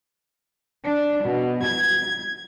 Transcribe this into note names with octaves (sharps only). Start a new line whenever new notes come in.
D4
B2
G#6